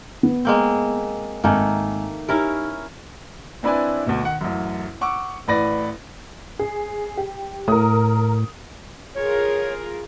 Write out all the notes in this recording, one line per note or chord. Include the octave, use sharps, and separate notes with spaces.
B3
G#3 A#3 C4
G#1 D#3 A3 A#3 G#5
C#4 D#4 E4 G4 A#4
C4 D4 E4 B4 D5 G#5
D2 B2
D#3 F#5
A1 F#2
F#5 C#6 D6 E6
A1 A2 B4 D5 A#6
G#4
G4
A2 A#4 D#6
F4 G#4 A#4 C#5